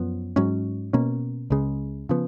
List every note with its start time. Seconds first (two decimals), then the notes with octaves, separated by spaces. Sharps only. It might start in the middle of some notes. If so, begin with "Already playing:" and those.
Already playing: F#2 F3 B3
0.36 G#2 F#3 C#4
0.93 B2 A#3 C#4
1.50 C#2 C#3 G#3
2.09 C#3 F3 B3